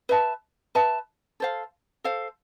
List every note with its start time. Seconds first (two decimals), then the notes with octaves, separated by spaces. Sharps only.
0.09 B4 E5 A5
0.75 B4 E5 A5
1.40 A4 C5 F5
2.04 A4 C5 F5